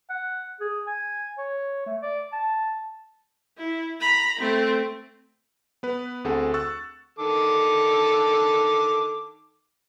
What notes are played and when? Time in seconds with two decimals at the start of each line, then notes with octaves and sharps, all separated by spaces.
0.10 F#5
0.61 G#4
0.87 G#5
1.38 C#5
1.86 A3
2.02 D5
2.32 A5
3.58 E4
4.01 A#5 B5
4.39 A3 C4
5.83 B3 B4
6.24 D2 C4 G#4 A4 F#5
6.54 C#6 E6 F#6 A6
7.19 D#3 A4 D6